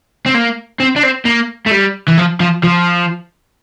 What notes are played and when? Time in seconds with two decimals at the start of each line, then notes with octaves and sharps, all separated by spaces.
0.26 C4
0.35 A#3
0.80 C4
0.96 D4
1.03 C4
1.26 A#3
1.66 A3
1.71 G3
2.08 E3
2.18 F3
2.40 F3
2.63 F3